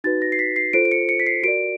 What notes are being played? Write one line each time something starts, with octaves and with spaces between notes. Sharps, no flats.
D#4 F#4 B4 A6
A#6
C7
B6
C7
F4 A4 C5 D7
D7
C#7
C#7
B6
C7
F#4 A#4 D5 D7